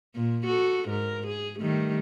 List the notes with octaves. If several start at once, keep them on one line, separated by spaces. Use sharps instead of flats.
A#2
F#4 A4
G#2 A#4
G#4
D#3 G3 A3